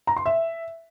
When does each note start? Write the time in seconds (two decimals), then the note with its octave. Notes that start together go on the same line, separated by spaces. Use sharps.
0.07 A#5
0.17 C6
0.26 E5